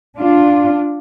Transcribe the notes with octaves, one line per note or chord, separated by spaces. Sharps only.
D4 F4